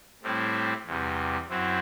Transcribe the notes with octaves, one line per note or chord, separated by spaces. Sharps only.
A2 G3 C4 E4
E2 C3 G3
F#2 F#3 C4 E4